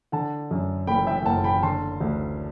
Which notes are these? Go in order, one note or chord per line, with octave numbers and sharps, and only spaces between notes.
D3 F#5 A5
F#2
F#1 G5 B5
E5 G5
G5
F#1 F#5 A5
G5 B5
D3 A5 C6
D2